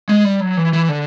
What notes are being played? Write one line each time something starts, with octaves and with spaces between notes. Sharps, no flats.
G#3
G3
F#3
E3
E3
D3